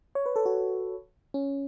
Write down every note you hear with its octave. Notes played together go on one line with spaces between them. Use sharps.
C#5
B4
A4
F#4
C#4